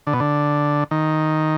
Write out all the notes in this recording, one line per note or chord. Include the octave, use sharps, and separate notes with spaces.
D3
B2
D3
D#3